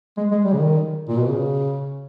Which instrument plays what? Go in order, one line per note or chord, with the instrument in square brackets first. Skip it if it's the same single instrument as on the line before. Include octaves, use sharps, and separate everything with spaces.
[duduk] G#3
G#3
G3
C#3
D#3
A#2
B2
C#3